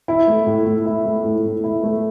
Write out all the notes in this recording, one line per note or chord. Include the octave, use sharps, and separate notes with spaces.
E4
A3
A2
A2
E4
A3
A2
A2
E4
A3